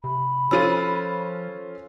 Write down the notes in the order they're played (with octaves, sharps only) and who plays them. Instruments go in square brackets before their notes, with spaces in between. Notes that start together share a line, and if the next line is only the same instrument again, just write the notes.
[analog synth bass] C3 [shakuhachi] B5
[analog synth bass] F3 [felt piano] C#4 F4 D#7 [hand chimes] A4 C5 E6